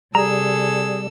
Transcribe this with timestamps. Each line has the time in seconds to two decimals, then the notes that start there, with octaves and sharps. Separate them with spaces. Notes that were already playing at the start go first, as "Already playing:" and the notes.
0.15 C3 G3 G#4 A4 A#5 E6